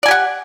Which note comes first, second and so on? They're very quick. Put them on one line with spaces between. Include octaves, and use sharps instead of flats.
D5 G#5 G4 F#5